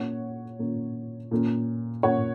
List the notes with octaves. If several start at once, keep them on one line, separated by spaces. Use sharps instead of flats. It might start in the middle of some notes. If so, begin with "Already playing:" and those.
Already playing: A#2 A#3 C#4 C#5 F#5
A#2 A#3 C#4
A#2 A#3 C#4
A#2 A#3 C#4 C#5 F#5